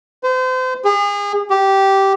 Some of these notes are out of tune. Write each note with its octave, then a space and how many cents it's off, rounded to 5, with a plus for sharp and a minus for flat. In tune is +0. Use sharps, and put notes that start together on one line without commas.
C5 -35
G#4 -35
G4 -10